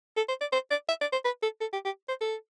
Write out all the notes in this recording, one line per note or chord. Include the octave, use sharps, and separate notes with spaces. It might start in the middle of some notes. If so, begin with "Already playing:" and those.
A4
C5
D5
C5
D5
E5
D5
C5
B4
A4
A4
G4
G4
C5
A4